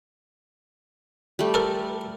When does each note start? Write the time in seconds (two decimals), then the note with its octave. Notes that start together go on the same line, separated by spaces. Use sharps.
1.39 G3 A3
1.54 A4 A#4